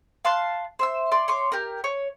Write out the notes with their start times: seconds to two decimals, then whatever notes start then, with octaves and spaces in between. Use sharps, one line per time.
0.25 F5 A5 C6 F#6
0.79 C5 E5 E6
1.12 D5 C6
1.28 C#5 C6 D6
1.52 G4 A#4
1.84 C#5